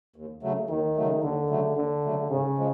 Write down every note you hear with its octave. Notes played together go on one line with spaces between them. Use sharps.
D#2
C#3 F#3 A3
D#2 D#3
C#3 F#3 A3
D#2 D3
C#3 F#3 A3
D#2 D3
C#3 F#3 A3
G#2 C#3
F3 G#3